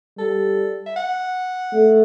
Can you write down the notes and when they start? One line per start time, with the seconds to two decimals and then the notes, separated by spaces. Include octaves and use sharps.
0.17 G3 A4
0.86 E5
0.96 F#5
1.73 A3